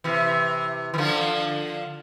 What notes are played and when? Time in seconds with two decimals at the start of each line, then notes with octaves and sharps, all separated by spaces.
0.04 C3 E3
0.94 E3
0.98 D3 F3